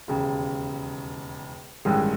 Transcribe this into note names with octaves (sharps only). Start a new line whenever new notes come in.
E1 D#2 C#3
A1 G2 D#3 G#3